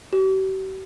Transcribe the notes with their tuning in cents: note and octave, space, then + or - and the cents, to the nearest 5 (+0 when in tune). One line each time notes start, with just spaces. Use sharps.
G4 -45